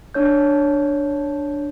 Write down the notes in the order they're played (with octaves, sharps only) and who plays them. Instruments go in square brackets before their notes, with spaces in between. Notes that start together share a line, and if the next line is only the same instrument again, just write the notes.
[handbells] D4 C#5 G6